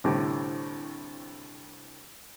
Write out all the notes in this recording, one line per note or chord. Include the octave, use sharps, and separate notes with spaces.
C2 A2 D3 G4